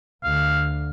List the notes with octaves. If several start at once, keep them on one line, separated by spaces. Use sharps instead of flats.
D2 D3 F5